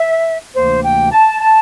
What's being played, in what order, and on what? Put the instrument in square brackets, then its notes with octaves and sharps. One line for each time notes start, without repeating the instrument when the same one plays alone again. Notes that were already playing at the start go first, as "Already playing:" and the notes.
Already playing: [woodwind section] E5
D2 C3 E3 A#3 D4 C5
G5
A5
A5